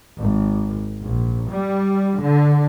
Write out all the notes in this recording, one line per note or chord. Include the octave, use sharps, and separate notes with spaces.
G#1
A#1
G3
D3